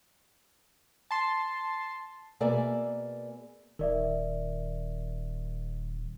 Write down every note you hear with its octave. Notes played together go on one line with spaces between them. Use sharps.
A5 C6
B2 A#3 G#4 D5 E5 G#5
D#1 D#3 A#4 D5 E5